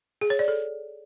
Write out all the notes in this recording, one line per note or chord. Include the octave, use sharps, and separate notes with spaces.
G#4
C#5
D5
A4